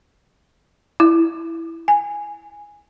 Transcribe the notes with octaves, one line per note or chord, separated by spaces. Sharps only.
E4
G#5